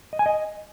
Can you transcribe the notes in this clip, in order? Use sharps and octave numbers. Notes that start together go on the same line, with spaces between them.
D#5
G#5
D#5